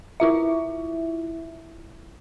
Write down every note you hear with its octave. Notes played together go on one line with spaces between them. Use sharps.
E4 F4 E5